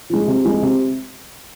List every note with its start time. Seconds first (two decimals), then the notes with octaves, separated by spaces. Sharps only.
0.10 F3 G#3
0.27 C3
0.44 F3 G#3
0.62 C3